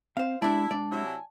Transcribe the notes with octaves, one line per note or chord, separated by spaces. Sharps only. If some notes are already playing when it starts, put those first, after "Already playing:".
C4 C5 F5
G#3 D4 E4 G4 D5 A5
G#3 D4 D5
C3 F#3 E4
G#5